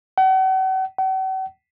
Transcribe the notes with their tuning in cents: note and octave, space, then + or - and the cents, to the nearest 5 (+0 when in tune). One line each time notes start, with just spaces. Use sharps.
F#5 +40
F#5 +45